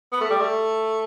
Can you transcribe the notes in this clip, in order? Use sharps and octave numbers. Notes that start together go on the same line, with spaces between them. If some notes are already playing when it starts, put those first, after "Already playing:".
B3
A3
G3
A3